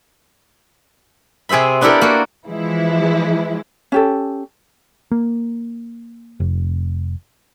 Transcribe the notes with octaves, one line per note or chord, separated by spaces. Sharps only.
C3 G#4 C5 E5 B5
B3 D4 E4 G4 A4 A#4
A#3 F#4 A4
E3 F3 G#3 E4
C#4 G4 A4
A#3
F1